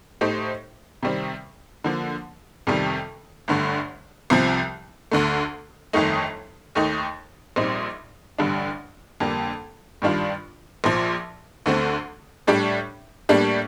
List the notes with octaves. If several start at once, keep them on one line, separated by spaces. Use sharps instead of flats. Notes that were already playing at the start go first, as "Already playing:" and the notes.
A2 A3 D#4 G4 C5
C3 D#3 G3 C4
D3 F3 A#3
F2 C3 D#3 G3
G1 G2 D3 A3
C2 C3 F3
D2 D3 A3
G1 F2 D#3 A3 D#4
D#2 D#3 A3 D#4
A#1 A#2 G3 C4 D#4
A1 G2 D3 G3 D4
F2 D3 G3 A#3
G2 D#3 G3 D4 F4
A#1 A#2 F3
D2 D3 A3 C4
A2 G3 D4 G4
A2 G3 A#3 D4 G4